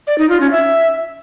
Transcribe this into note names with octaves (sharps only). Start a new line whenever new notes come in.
D5
D#4
F4
C#4
E5